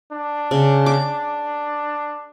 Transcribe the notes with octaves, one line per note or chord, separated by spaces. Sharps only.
D4
C#3
D6